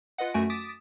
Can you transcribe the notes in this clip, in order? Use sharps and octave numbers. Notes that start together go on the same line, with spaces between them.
F4 B4 D#5 F#5
F#2 A3 F#4 G#5 D7
D6 D#6 A6 B6 D7 E7